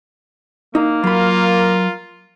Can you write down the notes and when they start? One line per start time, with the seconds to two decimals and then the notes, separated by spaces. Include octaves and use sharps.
0.75 A#3 D#4
1.04 F#3 F4 A#4 B5